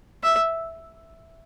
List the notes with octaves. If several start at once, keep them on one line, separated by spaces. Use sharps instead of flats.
E5